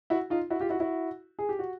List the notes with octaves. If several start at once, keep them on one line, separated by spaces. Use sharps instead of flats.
E4 F#4
D#4 F4
E4 F#4
F4 G4
E4 F#4
E4 F#4
G#4
G4
F#4